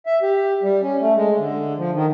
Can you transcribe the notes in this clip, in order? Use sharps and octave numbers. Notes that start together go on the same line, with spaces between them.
E5
G4
G3
C#4
A3
G#3
D3
F3
D#3